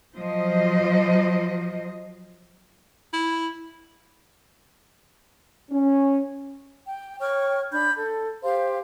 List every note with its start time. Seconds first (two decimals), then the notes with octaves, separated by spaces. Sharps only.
0.16 F3 F#3 C5 D#5
3.13 E4
5.70 C#4
6.87 G5
7.20 C#5 G5 C#6 F6
7.71 D4 B5 G6
7.95 A4
8.43 G4 C5 F5 C6